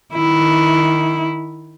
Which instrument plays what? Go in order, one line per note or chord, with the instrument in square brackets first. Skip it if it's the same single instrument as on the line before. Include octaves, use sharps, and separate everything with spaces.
[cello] D#3 E4